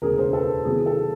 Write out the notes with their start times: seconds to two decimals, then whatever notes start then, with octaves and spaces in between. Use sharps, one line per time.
0.02 E1 D2 C#3 G#4 A#4
0.18 A#4 C5
0.33 A4 B4
0.65 E2 C3 D#3 F#3 B3 G#4
0.86 A4